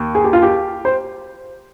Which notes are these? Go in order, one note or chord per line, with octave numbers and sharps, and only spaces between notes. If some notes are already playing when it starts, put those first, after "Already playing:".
Already playing: D#2
G#4
G4
F4
G4
C5